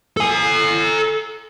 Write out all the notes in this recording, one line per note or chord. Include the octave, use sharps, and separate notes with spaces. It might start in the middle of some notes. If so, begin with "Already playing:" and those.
A4 G#5